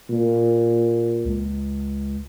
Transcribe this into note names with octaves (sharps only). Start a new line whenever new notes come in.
A#2
C#2